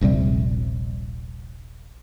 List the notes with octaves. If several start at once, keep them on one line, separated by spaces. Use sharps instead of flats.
D#1 A#1 C3 G3